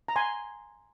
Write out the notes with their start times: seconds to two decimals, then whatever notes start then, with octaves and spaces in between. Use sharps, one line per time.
0.08 A#5
0.16 G#5 C6